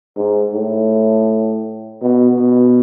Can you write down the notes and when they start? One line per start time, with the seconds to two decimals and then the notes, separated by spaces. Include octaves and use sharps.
0.17 G#2
0.54 A2
2.02 B2
2.39 B2